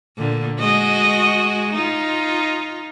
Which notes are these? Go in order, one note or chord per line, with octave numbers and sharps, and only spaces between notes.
A#2 D3
G#3 F#4 D#5
D#4 F4